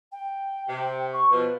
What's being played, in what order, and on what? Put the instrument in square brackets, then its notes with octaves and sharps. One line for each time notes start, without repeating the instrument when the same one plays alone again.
[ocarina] G5
[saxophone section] C3
[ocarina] C#6
[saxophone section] B2 F3 [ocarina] B4